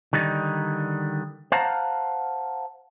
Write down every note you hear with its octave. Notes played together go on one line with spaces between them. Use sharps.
D3 D#3 G3 D#4
C5 F5 F#5 A5 A#5